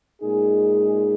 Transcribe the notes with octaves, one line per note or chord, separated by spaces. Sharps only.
A#2 G#3 D#4 G#4